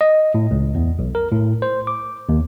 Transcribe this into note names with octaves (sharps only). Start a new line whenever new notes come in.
D#5
A2
C#2
E2
B1
A#4
A2
C5
D6
D#2